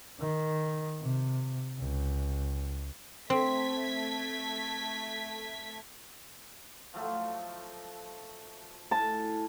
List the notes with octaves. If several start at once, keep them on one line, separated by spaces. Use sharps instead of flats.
D#3
C3
C#2
A3 C4 G#6 B6
F3 F#3 A3
A2 G#5 A5